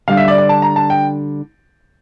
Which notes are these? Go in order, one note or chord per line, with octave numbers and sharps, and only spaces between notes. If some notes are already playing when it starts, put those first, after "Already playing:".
D3 G3 D4 F5
E5
D5
D5
A5
A#5
A5
G5